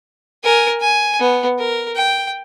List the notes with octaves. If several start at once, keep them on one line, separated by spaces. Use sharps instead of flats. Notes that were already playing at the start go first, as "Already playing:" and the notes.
A#4 G#5
G#5
B3
A#4
G5